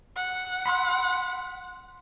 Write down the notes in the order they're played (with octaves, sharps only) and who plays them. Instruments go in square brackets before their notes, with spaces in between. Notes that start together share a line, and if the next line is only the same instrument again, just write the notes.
[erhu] F#5
[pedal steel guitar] B5 C6 E6